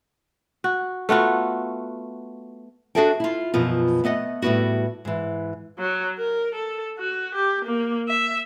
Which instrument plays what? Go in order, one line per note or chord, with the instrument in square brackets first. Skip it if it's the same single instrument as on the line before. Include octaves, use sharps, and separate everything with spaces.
[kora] F#4
A3 B3 F4 F#4
[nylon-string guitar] D4 F#4 G#4 A4 E5 G5
E4 F4
F#2 B2 F3 B3 F4
A3 B3 D#5 F#5
A2 G3 B3 E4 F#4
G#2 E3
[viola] F#3
A#4
A4
F#4
G4
A#3
E5